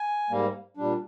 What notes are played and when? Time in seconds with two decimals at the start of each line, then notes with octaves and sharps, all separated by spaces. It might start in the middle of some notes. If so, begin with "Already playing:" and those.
Already playing: G#5
0.30 G#2 G3 A#3
0.77 A#2 G3 D4